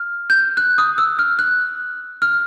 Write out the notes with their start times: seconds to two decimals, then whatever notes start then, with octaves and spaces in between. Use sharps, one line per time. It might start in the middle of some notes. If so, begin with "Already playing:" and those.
Already playing: F6
0.30 G6
0.57 F#6
0.78 D#6
0.98 E6
1.19 F6
1.39 F#6
2.22 F6